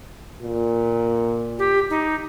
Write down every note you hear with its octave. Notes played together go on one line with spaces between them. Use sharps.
A#2
G4
D#4